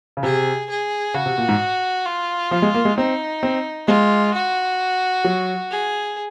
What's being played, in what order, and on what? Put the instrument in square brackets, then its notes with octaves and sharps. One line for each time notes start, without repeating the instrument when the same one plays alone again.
[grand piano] C#3
[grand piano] C3 [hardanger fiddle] G#4
[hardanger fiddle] G#4
[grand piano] C#3 [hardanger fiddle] F#4
[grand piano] C3
A#2
G#2
[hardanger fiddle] F4
[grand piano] F3
G#3
A#3
G#3
[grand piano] C4 [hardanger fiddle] D#4
[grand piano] C4
[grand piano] G#3 [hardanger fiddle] F4
[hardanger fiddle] F#4
[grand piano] F#3
[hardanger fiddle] G#4